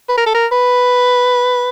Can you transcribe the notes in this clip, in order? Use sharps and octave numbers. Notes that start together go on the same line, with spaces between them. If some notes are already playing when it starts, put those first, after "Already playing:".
B4
A#4
A4
A#4
B4